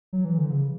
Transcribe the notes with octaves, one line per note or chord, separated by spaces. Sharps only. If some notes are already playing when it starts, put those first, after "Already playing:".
F#3
E3
D3
C#3